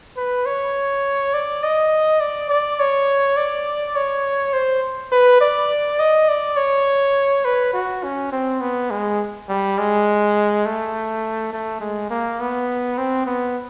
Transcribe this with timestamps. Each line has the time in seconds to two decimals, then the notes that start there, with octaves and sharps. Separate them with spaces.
0.17 B4
0.46 C#5
1.34 D5
1.63 D#5
2.20 D5
2.50 D5
2.80 C#5
3.37 D5
3.96 C#5
4.53 C5
5.12 B4
5.41 D5
6.00 D#5
6.29 D5
6.57 C#5
7.45 B4
7.73 F#4
8.04 C#4
8.32 C4
8.61 B3
8.90 G#3
9.49 G3
9.78 G#3
10.66 A3
11.53 A3
11.81 G#3
12.10 A#3
12.40 B3
12.98 C4
13.27 B3